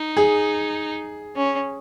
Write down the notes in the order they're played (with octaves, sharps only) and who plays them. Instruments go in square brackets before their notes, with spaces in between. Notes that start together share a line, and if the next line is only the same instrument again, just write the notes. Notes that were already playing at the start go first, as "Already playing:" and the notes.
Already playing: [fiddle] D#4
[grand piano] G#4
[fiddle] C#4